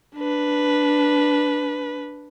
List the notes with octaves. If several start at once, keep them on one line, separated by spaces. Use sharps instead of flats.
D4 B4